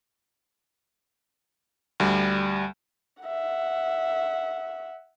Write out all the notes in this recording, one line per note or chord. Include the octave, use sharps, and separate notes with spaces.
D2 G3
E5 F#5